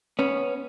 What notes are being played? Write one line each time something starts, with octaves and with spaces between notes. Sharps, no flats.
B3 C#4